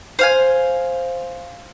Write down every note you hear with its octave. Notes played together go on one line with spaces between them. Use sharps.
C5 F5 G#5